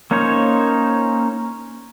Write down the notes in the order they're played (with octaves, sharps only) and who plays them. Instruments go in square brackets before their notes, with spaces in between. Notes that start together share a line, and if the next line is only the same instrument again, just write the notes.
[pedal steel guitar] A#3 C#4 D#4 C5 C#5